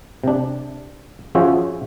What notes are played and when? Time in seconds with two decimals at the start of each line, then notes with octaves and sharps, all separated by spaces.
0.24 C3 D4
1.35 F3 C#4 F#4 G#4 C5 E5